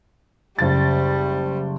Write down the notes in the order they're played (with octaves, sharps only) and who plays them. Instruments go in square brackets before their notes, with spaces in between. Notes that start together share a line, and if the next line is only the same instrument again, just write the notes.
[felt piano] F#1 A6 [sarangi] G3